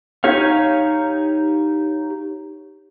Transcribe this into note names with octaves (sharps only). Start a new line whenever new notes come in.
D#4 G4 C#5 F5